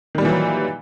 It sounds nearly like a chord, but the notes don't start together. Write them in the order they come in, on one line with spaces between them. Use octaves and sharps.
D#3 G3 A#2 E3 F#3